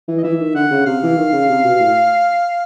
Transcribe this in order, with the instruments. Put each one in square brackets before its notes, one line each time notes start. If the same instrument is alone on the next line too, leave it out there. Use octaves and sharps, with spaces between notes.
[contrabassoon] E3
[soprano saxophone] D#5
[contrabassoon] E3 [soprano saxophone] E5
[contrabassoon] D#3
[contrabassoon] D3 [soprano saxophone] F#5
[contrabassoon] C#3
[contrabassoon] C3 [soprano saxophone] F5
[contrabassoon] E3
D#3
C#3
C3
B2
A2